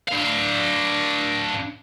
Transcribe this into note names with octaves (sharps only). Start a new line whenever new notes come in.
D4 F5